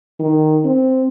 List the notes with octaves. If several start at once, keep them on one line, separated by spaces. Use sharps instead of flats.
D#3
C4